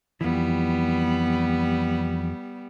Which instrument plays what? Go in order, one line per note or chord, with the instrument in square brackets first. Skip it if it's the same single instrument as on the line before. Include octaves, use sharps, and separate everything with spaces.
[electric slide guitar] F2 E3 [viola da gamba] G3 B3